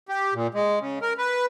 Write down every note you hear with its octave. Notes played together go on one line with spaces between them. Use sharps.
G4
A#2
G#3
C#3
A#4
B4